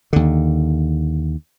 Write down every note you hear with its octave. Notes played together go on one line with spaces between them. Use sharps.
D#2 D3